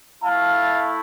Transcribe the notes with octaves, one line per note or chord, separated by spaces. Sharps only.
A3 E4 F5 A5